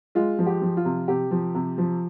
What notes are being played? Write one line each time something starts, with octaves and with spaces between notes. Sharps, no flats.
G#3 F4
F3
G4
F3
F4
C3
C3 G4
F3
C3
F3